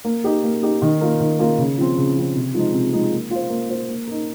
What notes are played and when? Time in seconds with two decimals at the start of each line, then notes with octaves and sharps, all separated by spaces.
0.05 A#3
0.24 D#4 G4
0.44 A#3
0.62 D#4 G4
0.82 D#3
1.01 A#3 F4 A#4
1.20 D#3
1.39 A#3 F4 A#4
1.58 C#3
1.78 F3 C4
1.97 C#3
2.16 F3 C4
2.35 C3
2.54 F3 G#3 C4 D#4
2.74 C3
2.92 F3 G#3 C4 D#4
3.11 A#3
3.30 F4 C5
3.50 A#3
3.70 F4 C5
3.88 A#3
4.08 D#4 A#4